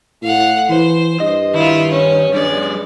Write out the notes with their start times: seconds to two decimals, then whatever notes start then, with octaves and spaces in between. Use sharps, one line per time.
0.23 A2 F5 F#5
0.69 E3 C5
1.20 G2 D#5
1.54 D#3 E4 F4
1.91 C#4
2.34 G2 G3 G#4 D5